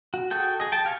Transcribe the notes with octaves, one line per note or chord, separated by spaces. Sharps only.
F#4
F#4 G#4 A4 G5
G#4 D#5
G5 A5
G4 F5 G#5 A5 C#6